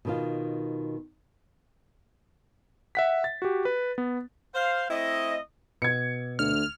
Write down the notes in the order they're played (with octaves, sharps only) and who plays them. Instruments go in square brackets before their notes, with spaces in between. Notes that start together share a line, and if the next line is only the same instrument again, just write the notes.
[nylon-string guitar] B2 D#3 F4
[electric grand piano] E5 F#5 B6
A6
F#4 G4
B4
B3
[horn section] C5 F5
A3 C4 E4 D#5
[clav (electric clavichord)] B2 [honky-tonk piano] G#6 C#7
[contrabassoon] D2 [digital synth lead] F6